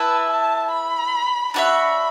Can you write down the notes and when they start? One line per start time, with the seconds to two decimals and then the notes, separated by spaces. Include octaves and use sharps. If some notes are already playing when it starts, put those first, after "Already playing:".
Already playing: E4 B4 E5 A5
0.30 A5
0.71 B5
1.54 D4 F#4 C#5 E5 B5